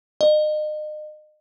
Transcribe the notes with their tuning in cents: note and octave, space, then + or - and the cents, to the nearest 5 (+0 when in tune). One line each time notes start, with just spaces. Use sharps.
D#5 -35